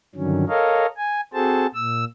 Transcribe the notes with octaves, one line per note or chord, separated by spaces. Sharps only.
G2 D3 D#3 F#3 C#4
A4 A#4 C#5 D#5 F5
G#5
C4 F#4 G#4 A4 C5 A5
A#2 E6